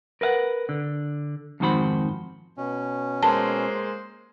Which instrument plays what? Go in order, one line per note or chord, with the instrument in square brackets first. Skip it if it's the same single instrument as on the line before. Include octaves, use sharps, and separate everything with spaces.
[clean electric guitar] A#4 B4 F5 F#5
D3
F2 G#2 D#3 F#4 C5 B5
[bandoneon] B2 C#4
[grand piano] G#3 A#3 [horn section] C5 [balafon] A5